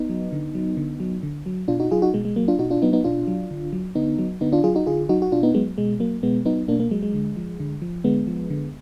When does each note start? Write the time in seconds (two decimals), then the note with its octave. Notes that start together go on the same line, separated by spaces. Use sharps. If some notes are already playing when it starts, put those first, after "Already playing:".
Already playing: B3 D#4
0.09 F#3
0.32 D3
0.55 F#3
0.77 D3
1.00 F#3
1.23 D3
1.46 F#3
1.68 B2 D4 F4
1.80 D#4 F#4
1.91 F#3 F4 G#4
2.02 D#4 F#4
2.14 B2 G#3
2.25 G#3
2.36 F#3 A#3
2.48 D4 F4
2.59 B2 D#4 F#4
2.70 D4 F4
2.82 F#3 B3 D#4
2.93 B3 D#4
3.04 B2 D4 F4
3.27 F#3
3.51 D3
3.73 F#3
3.95 D3 B3 D#4
4.19 F#3
4.41 D3 B3 D#4
4.52 D4 F4
4.63 F#3 F4 G#4
4.75 D#4 F#4
4.86 D3 F4 G#4
5.09 F#3 D#4 F#4
5.22 F#4
5.32 B2 D4 F4
5.43 B3 D#4
5.54 F#3 G#3 B3
5.78 B2 G#3
6.00 F#3 A#3
6.23 B2 G#3 B3
6.45 F#3 B3 D#4
6.68 B2 A#3 D4
6.80 A#3
6.91 F#3 G#3
7.02 G#3
7.14 D3
7.36 F3
7.60 D3
7.82 F3
8.04 D3 G#3 B3
8.27 F3
8.50 D3